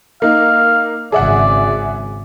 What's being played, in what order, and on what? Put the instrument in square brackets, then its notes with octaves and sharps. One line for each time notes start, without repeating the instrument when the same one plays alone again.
[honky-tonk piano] A#3 D#4 [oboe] F5
[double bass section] G#1 C#3 [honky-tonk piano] G#4 E5 F#5 [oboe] D5